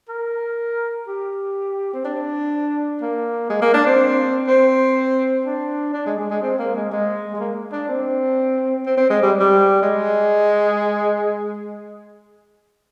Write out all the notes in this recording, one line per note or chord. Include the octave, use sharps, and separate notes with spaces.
A#4
G4
C4
D4
A#3
G#3
A#3
D4
C4
C4
D4
D4
G#3
G#3
G#3
C4
A#3
G#3
G#3
G#3
A#3
D4
C4
C4
C4
G#3
G3
G3
G#3